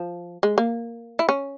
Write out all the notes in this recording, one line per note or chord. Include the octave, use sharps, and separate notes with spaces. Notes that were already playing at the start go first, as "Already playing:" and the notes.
Already playing: F3
G#3
A#3
E4
C#4